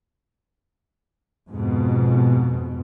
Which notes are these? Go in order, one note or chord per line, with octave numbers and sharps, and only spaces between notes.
F2 G#2 B2